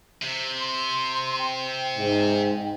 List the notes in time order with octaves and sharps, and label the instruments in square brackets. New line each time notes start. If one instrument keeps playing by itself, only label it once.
[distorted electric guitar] C3
[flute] C6
G5
[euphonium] G#2